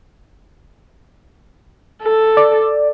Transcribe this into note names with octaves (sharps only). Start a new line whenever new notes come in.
A4
D5